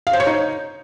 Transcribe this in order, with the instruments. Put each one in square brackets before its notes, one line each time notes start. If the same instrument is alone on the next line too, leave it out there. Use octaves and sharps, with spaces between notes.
[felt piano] F5
C5
C#5
D#4